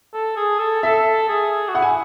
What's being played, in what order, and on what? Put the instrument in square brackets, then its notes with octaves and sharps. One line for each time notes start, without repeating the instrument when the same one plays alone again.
[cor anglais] A4
G#4
A4
[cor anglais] A4 [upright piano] E5
[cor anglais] G#4
F#4
[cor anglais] E4 [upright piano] F#5
[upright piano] G#5